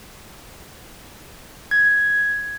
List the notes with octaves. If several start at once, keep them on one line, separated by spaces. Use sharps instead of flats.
G#6